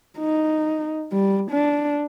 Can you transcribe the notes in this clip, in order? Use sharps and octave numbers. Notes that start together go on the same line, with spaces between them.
D#4
G3
D4